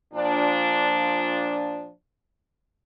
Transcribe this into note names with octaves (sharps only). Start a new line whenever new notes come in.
A#2 F3 D4